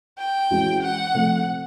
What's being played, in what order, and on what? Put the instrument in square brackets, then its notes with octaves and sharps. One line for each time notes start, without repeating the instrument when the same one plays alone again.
[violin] G5
[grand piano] E3 G#3 C#4 F#4
[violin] F#5
[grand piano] C3 F3 A3